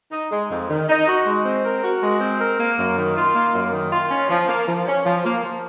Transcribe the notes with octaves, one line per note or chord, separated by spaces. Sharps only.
D#4
G#3
F2
D#3
D#4
F#4
G#3
C4
A#4
F#4
G#3
C4
A#4
A#3
F#2
D#3
F4
A#3
F#2
D#3
F4
C#4
F3
A#3
F3
C#4
F3
A#3
F3